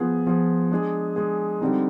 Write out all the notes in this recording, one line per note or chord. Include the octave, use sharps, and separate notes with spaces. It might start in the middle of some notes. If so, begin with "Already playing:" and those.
Already playing: F3 B3 F4 G#4
F3 B3 F4 G#4
G#3 D4 G#4
G#3 D4 G#4
D3 G3 C4 D#4